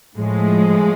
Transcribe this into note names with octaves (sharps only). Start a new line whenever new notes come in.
A2 F3 G#3